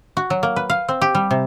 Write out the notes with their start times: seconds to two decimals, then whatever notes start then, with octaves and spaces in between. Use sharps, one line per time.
0.17 F#4
0.30 F#3
0.43 A#3
0.56 B4
0.70 F5
0.89 C4
1.01 G4
1.15 G3
1.31 C3